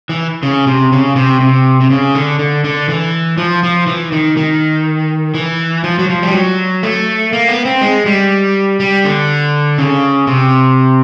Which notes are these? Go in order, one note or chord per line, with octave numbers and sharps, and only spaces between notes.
E3
C#3
C3
C#3
C3
C3
C3
C#3
D3
D3
D3
E3
F3
F3
E3
D#3
D#3
E3
F3
F#3
F3
G3
F#3
A3
A#3
B3
C4
G#3
G3
G3
D3
C#3
C3